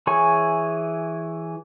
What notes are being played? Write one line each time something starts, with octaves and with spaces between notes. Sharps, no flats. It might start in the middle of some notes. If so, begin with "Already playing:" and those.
E3 G#4 C#5 G#5 C#6